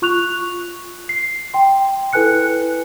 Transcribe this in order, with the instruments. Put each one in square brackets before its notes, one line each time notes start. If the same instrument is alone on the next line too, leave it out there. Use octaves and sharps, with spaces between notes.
[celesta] F4 C#6 F#6 F7
C7
G5 C6
E4 A4 B4 G#5 F#6 C#7